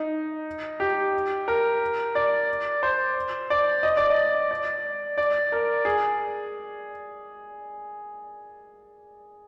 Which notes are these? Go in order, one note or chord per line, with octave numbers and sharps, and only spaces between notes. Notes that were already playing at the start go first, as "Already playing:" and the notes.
Already playing: D#4
G4
A#4
D5
C5
D5
D#5
D5
D#5
D5
D5
A#4
G#4